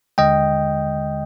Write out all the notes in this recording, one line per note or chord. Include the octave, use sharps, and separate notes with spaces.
D#2 D3 G#3 D#5 G5